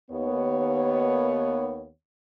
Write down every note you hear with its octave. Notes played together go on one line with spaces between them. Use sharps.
D#2 B3 C#5